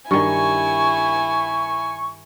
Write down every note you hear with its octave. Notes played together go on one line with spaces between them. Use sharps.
G2 D#3 E4 G#5 C#6